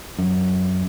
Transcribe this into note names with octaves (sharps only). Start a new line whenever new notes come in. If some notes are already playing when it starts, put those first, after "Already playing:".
F#2